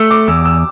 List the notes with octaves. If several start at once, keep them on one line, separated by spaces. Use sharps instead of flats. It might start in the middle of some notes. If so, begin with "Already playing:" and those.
Already playing: A3 E6
D6
E2 E6
E6